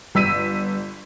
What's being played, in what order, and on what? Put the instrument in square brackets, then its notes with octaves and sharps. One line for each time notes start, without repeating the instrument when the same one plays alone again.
[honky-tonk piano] G1 E6 B6 D#7